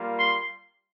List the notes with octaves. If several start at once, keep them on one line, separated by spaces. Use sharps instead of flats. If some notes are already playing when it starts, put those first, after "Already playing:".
Already playing: G3 A#3 F4
C6